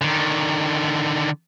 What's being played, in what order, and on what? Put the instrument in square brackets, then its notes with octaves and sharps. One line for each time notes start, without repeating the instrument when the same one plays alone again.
[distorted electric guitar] D3 D#3